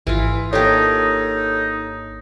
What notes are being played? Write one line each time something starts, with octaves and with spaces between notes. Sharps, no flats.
G#1 E3 F4
A#3 D4 D#4 G4 A4 C#5